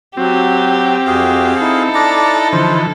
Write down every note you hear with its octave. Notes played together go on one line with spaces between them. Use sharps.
F#3 C4 F#4 G4
F2 F#4 G#4 F5
D#4 E4 A4
D4 D5 A#5
D3 E3 F3 C5